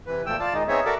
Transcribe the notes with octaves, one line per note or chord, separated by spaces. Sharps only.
C3 E3 B4
E2 A#2 F3 A3 G5 E6
F4 D5 A5
D#3 G#3 D#4
B3 C4 D#4 G#4 C#5 E5
F#4 A4 A#4 D5 E5